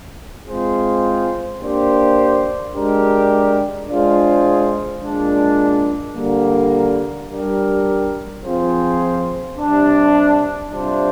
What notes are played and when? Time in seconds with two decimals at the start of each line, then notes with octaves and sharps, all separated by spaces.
0.46 G#3 C4 F4 G#4 C5
1.60 A#3 D4 G4 C5
2.74 G#3 D4 G4 A#4
3.88 G#3 D4 F4 G#4 C5
5.01 A#2 G#3 D4
6.16 D3 G3 A#3
7.29 G3 D4 G4 A#4
8.44 F3 C4 F4 G#4 C5
9.58 C3 G3 D4
10.72 C3 G3 D4 F4 C5